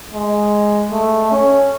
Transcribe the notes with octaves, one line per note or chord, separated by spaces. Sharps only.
G#3
A3
C#4